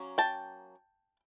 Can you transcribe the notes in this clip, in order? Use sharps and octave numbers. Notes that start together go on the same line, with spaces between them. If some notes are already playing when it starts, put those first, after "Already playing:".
Already playing: F#3 A#3 C#4
G5 A5